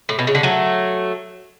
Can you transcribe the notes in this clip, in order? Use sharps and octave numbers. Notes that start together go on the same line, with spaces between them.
A2
B2
C#3
D3
F#3 A3